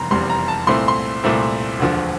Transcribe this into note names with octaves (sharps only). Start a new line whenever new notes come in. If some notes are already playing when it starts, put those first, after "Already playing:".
Already playing: F1 E2 C3 G3 A#5 C6
F1 E2 C3 G3 C6
A#5
A5
C2 A#2 A3 C4 E4 C6
C6
C2 A#2 A3 C4 E4
E1 D2 D3 F3